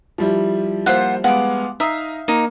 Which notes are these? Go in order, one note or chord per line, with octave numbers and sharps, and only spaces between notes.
F3 G3 E4
A#3 F4 C5 E5 F#5
G#3 B3 F5 F#5 D6
D#4 E5 F5 A#5 D#6
A#3 D#4